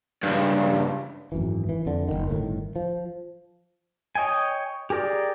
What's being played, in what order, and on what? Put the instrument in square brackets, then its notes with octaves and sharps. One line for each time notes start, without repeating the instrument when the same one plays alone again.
[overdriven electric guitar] C#2 G2
[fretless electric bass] G#1 F#2 E3
E3
F2 D3
F#1 C2 D#3
G1 A2 D3 D#3
F3
[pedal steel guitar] C#5 D#5 G5 G#5
G4 G#4 A#4 D5 G5